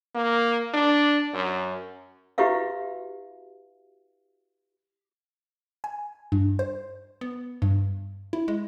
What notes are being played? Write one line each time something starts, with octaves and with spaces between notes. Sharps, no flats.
A#3
D4
F#2
E4 F#4 G4 B4 E5 F5
G#5
G2
C5
B3
G2
E4
G#3